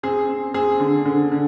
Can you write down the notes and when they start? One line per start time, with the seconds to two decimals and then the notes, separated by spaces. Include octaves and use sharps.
0.03 C4 G#4
0.29 C4
0.54 C4 G#4
0.80 D3
1.05 D3
1.32 D3